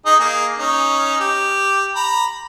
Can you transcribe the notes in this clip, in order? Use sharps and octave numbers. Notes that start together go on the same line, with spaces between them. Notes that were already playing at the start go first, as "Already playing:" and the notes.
D#4 G#4 D#5
A#3 G#4
C#4 D#4
G4
A#5 B5